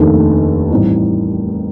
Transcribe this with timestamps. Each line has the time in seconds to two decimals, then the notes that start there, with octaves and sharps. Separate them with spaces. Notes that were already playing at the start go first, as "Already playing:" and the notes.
Already playing: F1 D#2 D#3 A3 D4
0.70 A1 A2 G3 C4 D#4